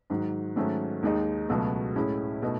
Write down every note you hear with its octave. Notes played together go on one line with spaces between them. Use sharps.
G#2 D#3 F#3
G#2 D#3 F#3 A3 C#4
D#2 D#3 G#3 D#4
C#2 B2 F#3 A3
A2 G#3 C#4 E4
B2 A3 D#4